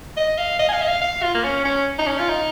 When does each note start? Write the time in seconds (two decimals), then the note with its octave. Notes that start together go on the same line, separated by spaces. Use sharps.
0.17 D#5
0.38 F5
0.59 D#5
0.69 G#5
0.73 F5
0.82 D#5
0.88 F5
1.02 F5
1.23 F4
1.35 A#3
1.44 C#4
1.65 C#4
1.99 D#4
2.07 C#4
2.19 F4
2.29 D#4